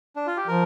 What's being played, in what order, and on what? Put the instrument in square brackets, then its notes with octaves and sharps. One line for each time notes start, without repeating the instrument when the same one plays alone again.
[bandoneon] D4
F4
G4
[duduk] F3 [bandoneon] A#4